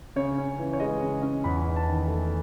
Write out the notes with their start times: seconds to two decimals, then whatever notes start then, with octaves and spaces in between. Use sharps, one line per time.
0.16 C#3 C#5
0.38 C#4
0.58 E3
0.73 C#5
0.80 G#3 D#5
1.02 C#3
1.22 C#4
1.44 E2 B5
1.66 D#4
1.76 A5
1.86 D#3
2.08 A3